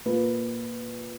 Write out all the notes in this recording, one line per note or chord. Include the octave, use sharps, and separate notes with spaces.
A#2 A#3 B4